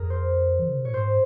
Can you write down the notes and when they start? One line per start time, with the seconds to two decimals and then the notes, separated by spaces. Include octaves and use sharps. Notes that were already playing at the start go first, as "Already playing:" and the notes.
Already playing: F2 G#4 A#4
0.10 C5
0.59 E3
0.68 C#3
0.76 C3
0.85 A#2 C#5
0.93 G#2 C5